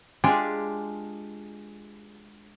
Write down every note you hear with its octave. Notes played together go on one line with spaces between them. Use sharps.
G#3 D4 F4 G4 G#4